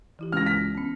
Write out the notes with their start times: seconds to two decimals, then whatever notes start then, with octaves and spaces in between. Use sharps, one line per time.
0.19 E3 E4 G4
0.32 C#2 F6 A#6
0.46 B6
0.75 B3 C#4